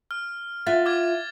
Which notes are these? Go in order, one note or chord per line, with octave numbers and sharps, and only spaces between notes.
F6
F4 E5 F#5 A6
D6 F6 G#6